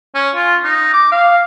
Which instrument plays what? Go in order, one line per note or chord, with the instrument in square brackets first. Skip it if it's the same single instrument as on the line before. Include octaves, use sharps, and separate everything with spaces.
[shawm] C#4
F4
D#4
D6
F5